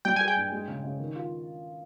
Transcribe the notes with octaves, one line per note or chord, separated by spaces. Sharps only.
G3 G5
G#4 G#5
G5
G2
G#3
C#3
C#3
D#3
F4